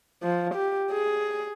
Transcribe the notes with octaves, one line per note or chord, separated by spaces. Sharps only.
F3
G4
G#4